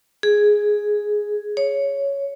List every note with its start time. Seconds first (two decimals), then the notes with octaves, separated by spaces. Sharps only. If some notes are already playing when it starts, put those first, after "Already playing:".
0.23 G#4
1.57 C#5